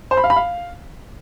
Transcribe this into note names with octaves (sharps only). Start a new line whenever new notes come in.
C5
B5
F5
B5
F5